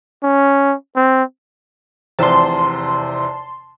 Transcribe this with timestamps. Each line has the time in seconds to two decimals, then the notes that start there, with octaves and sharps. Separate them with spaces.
0.23 C#4
0.96 C4
2.19 F1 E2 C3 A5 C6